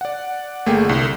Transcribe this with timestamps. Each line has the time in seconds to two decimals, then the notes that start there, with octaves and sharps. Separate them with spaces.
0.01 D5 F#5
0.66 G1 A3 A#3 G#4 G5
0.85 C2 D3